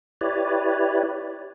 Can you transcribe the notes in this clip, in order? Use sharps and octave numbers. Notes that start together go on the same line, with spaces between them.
E4 G4 B4 C#5 D5